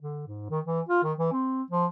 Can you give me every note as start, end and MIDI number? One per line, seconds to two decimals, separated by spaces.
0.01 0.23 50
0.27 0.48 44
0.50 0.60 51
0.65 0.81 52
0.89 1.01 65
1.03 1.13 51
1.18 1.29 52
1.32 1.62 60
1.71 1.86 53